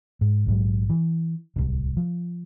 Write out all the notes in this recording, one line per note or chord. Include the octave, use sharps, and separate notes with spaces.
G#2
A#1 G#2 F#3
E3
D1 C2
F3